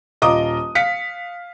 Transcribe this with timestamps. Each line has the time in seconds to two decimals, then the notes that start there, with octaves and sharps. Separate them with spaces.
0.22 D#1 F4 D#5 A#5 D6 D#6
0.75 F5 B6 C#7